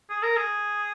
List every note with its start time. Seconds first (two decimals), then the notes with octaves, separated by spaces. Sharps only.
0.10 G#4
0.23 A#4
0.36 G#4